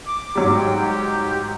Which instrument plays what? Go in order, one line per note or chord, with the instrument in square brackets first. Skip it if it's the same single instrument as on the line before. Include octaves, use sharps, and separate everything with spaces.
[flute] D6
[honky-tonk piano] G#2 F#3 G3
[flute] G5
G4